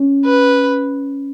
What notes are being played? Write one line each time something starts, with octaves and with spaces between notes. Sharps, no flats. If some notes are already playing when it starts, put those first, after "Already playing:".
Already playing: C#4
B4